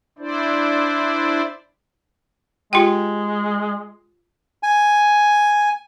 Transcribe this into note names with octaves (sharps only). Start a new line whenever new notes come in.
D4 E4 C5 D5
G#3 F4 G4 G5
G#5